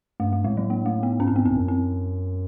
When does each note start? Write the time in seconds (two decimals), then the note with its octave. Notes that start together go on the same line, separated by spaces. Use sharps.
0.20 G2 A3
0.33 A3
0.44 A2 G#3
0.57 F#3
0.70 A#3
0.86 A3
1.03 B3
1.19 G#2 C#4
1.27 C4
1.32 G#2 B3
1.44 F2 C4
1.52 G2
1.56 F#2
1.68 C4